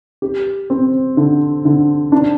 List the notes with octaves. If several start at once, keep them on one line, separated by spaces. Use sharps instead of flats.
G4
C4
D3
D3
D4